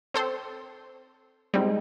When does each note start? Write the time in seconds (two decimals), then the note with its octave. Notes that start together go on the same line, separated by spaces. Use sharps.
0.14 C4 A4 C5
1.54 G3 G#3 C4 D#4